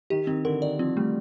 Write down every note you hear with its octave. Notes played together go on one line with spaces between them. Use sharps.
D#3 G4
D#3 C4
D3 A#4
D#3 D5
F3 C4
G3 A3